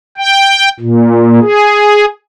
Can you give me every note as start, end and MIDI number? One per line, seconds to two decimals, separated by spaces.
0.18 0.69 79
0.80 1.40 46
1.41 2.05 68